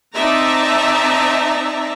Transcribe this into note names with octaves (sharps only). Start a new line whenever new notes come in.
C4 D#4 D5 E5 A5 A#5